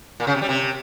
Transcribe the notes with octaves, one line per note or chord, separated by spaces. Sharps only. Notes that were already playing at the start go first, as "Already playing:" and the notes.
A#2
C#3
C3
G3
C3